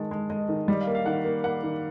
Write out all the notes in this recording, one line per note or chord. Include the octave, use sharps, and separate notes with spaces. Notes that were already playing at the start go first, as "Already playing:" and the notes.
Already playing: D#3 G#3 A5
G#3
G#3 D#5
D#3
G3 D#5
F5
A#3
F5
D#3 F#5
A#3
A#3 F#5
D#3